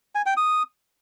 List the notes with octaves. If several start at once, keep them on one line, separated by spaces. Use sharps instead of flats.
G#5
G5
D#6